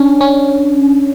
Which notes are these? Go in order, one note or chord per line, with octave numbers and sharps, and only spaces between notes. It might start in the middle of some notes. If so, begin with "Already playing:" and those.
Already playing: C#4 D4
C#4